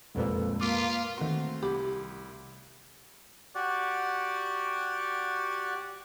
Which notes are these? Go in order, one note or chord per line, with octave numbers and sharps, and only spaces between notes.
C2 F2 A#2 G#3 A4 B4
A#3 F4 D6 B6 D#7
D#3 A3 C4 F#4 C6
C2 G4 B5 D6
F#4 G4 D5 F#5